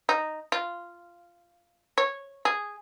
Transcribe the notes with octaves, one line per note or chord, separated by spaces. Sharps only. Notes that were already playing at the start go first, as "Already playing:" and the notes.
D#4
F4
C#5
G#4